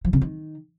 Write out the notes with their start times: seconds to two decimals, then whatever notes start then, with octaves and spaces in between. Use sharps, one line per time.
0.05 F3
0.13 C#3
0.22 D#3